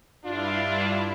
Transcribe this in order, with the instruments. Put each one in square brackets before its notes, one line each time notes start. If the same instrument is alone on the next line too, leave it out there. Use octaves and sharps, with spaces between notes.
[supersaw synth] G2 E4 [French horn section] D4 F4